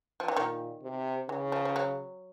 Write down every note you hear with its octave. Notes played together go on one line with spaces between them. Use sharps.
F3
E3
A#2 D#3
C3
C#3 E3
F3
F3
F#3